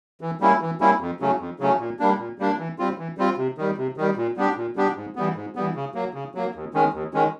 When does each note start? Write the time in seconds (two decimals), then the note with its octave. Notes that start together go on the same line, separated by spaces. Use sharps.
0.21 E3
0.40 G3 A#3 C#4 E4
0.61 E3
0.81 G3 A#3 C#4 E4
1.01 F2
1.20 C#3 F#3 A3 C#4
1.40 F2
1.60 C#3 F#3 A3 C#4
1.80 A#2
1.99 G3 A#3 D4
2.18 A#2
2.39 G3 A#3 D4
2.58 E3
2.78 G3 C4 F4
2.98 E3
3.18 G3 C4 F4
3.37 C3
3.58 D#3 G3
3.77 C3
3.97 D#3 G3
4.17 A#2
4.37 G3 B3 D4 G4
4.57 A#2
4.76 G3 B3 D4 G4
4.96 G#2
5.16 E3 G3 B3
5.36 G#2
5.56 E3 G3 B3
5.75 C#3
5.94 F#3 A#3
6.14 C#3
6.35 F#3 A#3
6.55 D#2
6.74 D#3 G#3 C#4
6.94 D#2
7.14 D#3 G#3 C#4